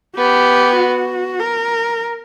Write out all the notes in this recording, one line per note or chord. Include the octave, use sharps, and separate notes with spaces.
B3 G4
F#4
A#4